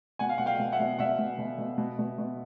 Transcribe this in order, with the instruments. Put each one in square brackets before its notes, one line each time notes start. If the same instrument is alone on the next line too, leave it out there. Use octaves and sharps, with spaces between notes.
[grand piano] B2 F#5 G#5
F5
B2 F#5
F5 G5
B2
E5 F#5
B2
B2 E5 F#5
B2
B2
B2
B2
B2
B2